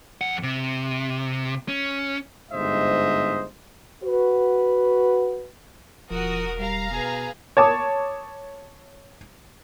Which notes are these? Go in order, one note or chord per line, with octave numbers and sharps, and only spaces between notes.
F2 F#5
C3
C#4
G1 G#2 C5 D#5 E5
F#4 B4
E1 F3 F#4 A#4 D#6
G3 F5 A#5
B2 G#4 B4
C#5 A5 D6 D#6